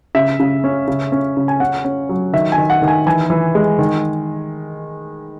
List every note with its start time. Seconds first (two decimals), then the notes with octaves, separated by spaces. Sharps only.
0.15 C#3 E5
0.40 C#3
0.64 C#4
0.88 C#3
1.12 C#4
1.37 C#3
1.48 G#5
1.60 C#4 F#5
1.84 C#4
2.09 F#3
2.33 D#3 E5
2.52 G#5
2.58 D#3
2.70 F#5
2.82 D#3
2.88 G#5
3.06 E3 G#5
3.30 E3
3.55 G#3
3.79 D#3